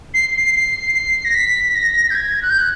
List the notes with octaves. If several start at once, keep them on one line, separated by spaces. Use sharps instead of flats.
C7
C7
C7
C7
A#6
B6
A#6
G6
G#6
F#6
G6
F#6